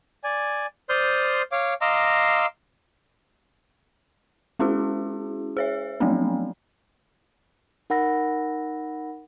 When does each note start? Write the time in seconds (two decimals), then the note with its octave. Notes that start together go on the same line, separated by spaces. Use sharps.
0.24 D5 G#5
0.89 C5 D5 C6 D#6 F6 G6
1.52 C#5 F5 D6
1.81 D#5 F5 A#5 C6 D6 E6
4.59 G#3 C#4 E4 F#4 G#4
5.57 G#4 C#5 E5
6.00 F3 F#3 A3 B3 C4 D4
7.90 D#4 A#4 F#5 B5 E6 A#6